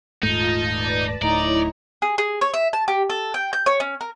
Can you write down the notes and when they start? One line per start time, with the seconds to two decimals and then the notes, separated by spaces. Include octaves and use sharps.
0.23 D#1 G#2 A3 D#4 F4 A5 D#6
0.68 B4 D5 A5
1.22 D1 A2 D#4 E4 C#5 D5 A#5
2.02 G#4
2.18 G#4
2.41 C#5
2.54 E5
2.73 A5
2.88 G4
3.10 A4
3.34 G5
3.53 G6
3.66 C#5
3.80 C#4
4.01 A#4